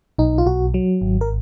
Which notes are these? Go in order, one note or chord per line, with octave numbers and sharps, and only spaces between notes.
B1 D#4
F4
B1 F#4
F#3
G#1
A#4